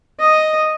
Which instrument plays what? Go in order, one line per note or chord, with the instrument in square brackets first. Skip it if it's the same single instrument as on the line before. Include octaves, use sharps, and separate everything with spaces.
[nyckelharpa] D#5